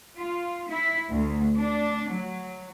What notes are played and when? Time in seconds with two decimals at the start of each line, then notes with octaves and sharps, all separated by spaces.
0.17 F4
0.69 E4
1.10 D2
1.56 D4
2.11 F#3